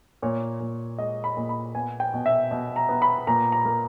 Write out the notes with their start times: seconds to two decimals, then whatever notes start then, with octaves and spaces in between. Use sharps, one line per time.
0.22 A#2 C#5
0.60 A#2
0.98 G#3 D#5
1.24 B5
1.37 A#2
1.49 B5
1.74 B3 G#5
2.00 G5
2.13 B2
2.26 E5
2.51 B2
2.76 A#5
2.89 B3
3.02 B5
3.27 A#2 A#5
3.52 A#5
3.65 A#3